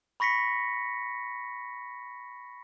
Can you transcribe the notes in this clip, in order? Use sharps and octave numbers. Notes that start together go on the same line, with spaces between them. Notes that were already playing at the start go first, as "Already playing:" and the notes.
B5 C#6 A#6 B6 C#7